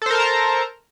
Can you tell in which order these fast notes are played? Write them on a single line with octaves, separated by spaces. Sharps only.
A4 C5 A#4 A5 A#5